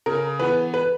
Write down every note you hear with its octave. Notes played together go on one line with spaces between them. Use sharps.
C#3 A#4
E3 B3 B4
B4